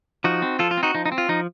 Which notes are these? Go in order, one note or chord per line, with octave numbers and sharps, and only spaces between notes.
F3 D#4 F#4
C4
F3 F4 A4
F4
C4
D#4 F#4
F3 D#4
D#4
C4
F4
F3 D#4